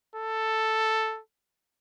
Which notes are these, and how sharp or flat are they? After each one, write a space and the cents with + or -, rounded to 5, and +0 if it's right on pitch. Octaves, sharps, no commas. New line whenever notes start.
A4 +5